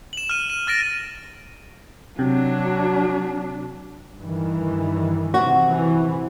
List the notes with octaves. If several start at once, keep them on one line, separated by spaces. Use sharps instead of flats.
E7 F#7
F6 D#7
D#7
F6 A6 A#6 D7
C3 F#3 D4
G2 D#3 E3
C3 F#4
E3